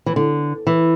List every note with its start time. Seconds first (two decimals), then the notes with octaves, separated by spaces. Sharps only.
0.06 E3
0.16 D3
0.67 E3